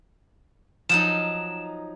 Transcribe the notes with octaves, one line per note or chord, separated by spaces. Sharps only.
F3 F#3 D#4 E7